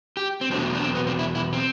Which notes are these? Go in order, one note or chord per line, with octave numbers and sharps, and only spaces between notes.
G4
C4
E2 B2 F#3 A3 D4
D4
C4
B3
C4
E4
E4
C4